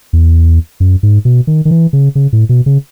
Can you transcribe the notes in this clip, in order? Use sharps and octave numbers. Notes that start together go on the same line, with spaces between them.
E2
F#2
G#2
B2
D#3
D#3
E3
C#3
C#3
A2
B2
C#3